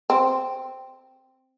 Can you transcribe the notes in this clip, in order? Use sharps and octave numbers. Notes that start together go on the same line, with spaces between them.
C4